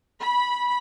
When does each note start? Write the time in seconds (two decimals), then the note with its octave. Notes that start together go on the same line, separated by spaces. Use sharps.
0.23 B5